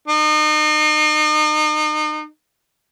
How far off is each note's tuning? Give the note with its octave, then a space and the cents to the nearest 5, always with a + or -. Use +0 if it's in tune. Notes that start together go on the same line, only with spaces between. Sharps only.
D#4 -35